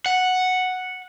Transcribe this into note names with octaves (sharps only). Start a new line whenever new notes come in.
F#5